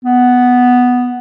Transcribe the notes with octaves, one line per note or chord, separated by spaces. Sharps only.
B3